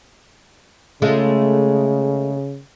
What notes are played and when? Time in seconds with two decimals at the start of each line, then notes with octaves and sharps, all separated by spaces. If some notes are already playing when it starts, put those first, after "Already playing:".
1.02 C#3 G#3 A3 F4